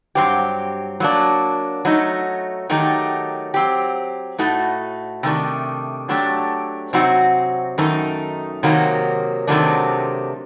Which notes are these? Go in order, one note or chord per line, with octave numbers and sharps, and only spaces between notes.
G2 F#3 C4 G4
F#3 A#3 D4
F#3 A3 D#4
D#3 F#3 A3 D#4 G4
F#3 C4 G4
A2 A3 D#4 F#4
C3 D#3 A3 D4
F#3 A3 D4 G4
C3 F#3 C4 D#4 F#4
F#2 D#3 A3 D#4
C3 D#3 F#3 A#3
C3 D#3 F#3 A3 D4